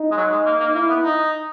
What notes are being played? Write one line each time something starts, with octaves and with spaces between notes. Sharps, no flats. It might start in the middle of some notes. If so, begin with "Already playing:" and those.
Already playing: D#4
G#3
F#3
G#3
A#3
A#3
A#3 E4
B3
D#4